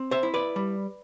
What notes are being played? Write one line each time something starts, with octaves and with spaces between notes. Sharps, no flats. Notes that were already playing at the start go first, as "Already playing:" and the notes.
Already playing: C4
C5 E5
E4
B4 D5
G3